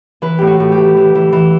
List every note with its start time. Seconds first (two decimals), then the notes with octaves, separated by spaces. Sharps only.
0.22 E3 B4
0.38 A2 G4
0.47 F#4
0.60 A2
0.72 G4
0.78 E3
0.97 E3
1.15 E3
1.33 E3